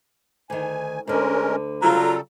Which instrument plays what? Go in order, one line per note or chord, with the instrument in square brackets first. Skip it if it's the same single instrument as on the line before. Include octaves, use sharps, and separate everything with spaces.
[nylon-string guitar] D2 D#3 [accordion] G#5
[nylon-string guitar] D2 D3 [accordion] G#3 C#4 A#4
[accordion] C#3 G3 A4 [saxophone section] F#3 F4 [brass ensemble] A#5